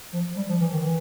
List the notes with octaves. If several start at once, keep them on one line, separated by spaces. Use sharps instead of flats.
F3
G3
F3
E3
D#3
E3